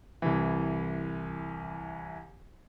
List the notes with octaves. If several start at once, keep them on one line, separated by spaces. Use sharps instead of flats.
C2 E3